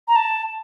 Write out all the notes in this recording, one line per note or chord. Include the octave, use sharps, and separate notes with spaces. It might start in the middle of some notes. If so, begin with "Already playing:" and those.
A#5
A5